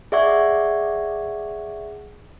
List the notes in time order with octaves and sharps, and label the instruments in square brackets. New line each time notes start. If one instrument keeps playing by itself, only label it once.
[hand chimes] G#4 D5 E5 F#5 C#6 G#6